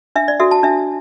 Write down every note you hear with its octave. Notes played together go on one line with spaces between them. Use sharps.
D4 E5
D5
F#4 A4 E5
A5
D4 E5